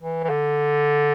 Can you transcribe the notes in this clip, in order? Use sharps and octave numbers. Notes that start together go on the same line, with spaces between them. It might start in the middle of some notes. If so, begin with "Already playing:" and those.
E3
E3
D3